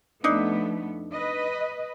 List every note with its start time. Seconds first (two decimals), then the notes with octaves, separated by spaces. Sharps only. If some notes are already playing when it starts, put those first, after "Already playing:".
0.24 F2 A3 B3 D4 D#4
1.12 B4 D#5